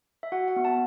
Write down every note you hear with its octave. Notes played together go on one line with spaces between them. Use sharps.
E5
F#4 F#5
F#5
B3
A5